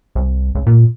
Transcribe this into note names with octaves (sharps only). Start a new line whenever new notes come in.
C2
C#2
A#2